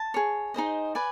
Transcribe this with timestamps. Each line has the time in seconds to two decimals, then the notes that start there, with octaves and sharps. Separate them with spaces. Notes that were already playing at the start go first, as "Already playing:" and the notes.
Already playing: A5
0.14 G#4 C#5
0.54 D#4 G#4 C5 D#5
0.95 B4 D5 G#5